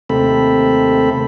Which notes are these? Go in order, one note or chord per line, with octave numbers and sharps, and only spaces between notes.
D#2 C3 A3 C4 A4 B5